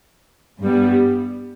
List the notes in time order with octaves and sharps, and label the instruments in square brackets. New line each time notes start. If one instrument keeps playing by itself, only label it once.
[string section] G2 G3 B3